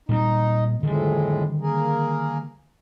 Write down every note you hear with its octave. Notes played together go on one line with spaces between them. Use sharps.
A#2 G3 C4 D#4
F2 A2 D3 D#3 G3 G#3
A#3 G#4 A#4